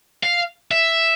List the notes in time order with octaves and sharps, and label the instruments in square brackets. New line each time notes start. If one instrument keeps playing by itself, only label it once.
[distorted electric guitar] F5
E5